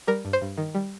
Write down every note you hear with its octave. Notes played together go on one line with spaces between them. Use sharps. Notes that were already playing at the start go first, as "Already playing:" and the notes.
G3 A#4
G2
C5
G2
D#3
G3